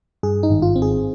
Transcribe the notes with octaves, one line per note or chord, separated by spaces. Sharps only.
G2 G#4
D#4
G#1
F4
C4
G#4